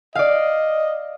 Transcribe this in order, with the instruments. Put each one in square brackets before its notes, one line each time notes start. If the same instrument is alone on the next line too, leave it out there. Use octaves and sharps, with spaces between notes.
[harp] D5 F5 [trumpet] D#5